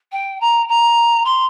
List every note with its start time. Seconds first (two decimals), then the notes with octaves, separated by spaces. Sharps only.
0.12 G5
0.40 A#5
0.68 A#5
1.24 C6